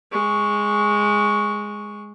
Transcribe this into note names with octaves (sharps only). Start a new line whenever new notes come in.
G#3 C#6